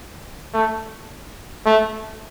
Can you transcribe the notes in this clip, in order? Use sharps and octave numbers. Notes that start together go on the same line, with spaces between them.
A3
A3